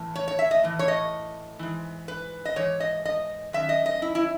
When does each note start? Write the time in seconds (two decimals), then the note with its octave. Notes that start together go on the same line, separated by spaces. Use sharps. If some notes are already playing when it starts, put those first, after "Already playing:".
Already playing: A2 E3
0.15 C#5
0.28 C#5
0.39 E5
0.51 D#5
0.63 A2 E3
0.79 C#5
0.88 D#5
1.59 G#2 E3
2.08 B4
2.45 D#5
2.56 G#2 E3 C#5
2.80 D#5
3.05 D#5
3.53 F#2 D#3 E5
3.69 D#5
3.86 D#5
4.02 E4
4.15 E4